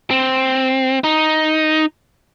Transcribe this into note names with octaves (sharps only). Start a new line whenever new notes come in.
C4
D#4